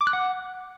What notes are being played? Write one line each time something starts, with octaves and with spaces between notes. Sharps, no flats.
D6
F#6
F#5